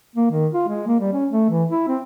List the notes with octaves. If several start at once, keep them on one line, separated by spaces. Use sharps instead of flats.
A#3
D#3
F4
G#3
A#3
G3
C#4
A3
E3
E4
C4